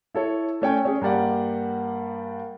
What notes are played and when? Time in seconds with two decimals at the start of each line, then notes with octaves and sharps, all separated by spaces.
0.15 E4 A4 C#5
0.62 A3 C#4 G5 G#5
0.85 C#4 G#4
1.01 G2 A#3 G4 D5 F#5